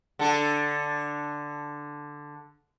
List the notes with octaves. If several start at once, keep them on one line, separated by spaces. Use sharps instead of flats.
D3 A4